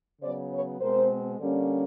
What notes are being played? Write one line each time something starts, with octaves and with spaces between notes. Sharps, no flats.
C#3 F#3 B3 C5 D5
B4 C#5
B2 G#3 C4 A#4 C5
D3 G3 A#3 C#4